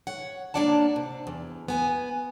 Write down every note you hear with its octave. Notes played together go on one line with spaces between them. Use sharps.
C#5 F#5
A#3 D4 C#5 D5 F#5 A5
C3
E2
B3 G#5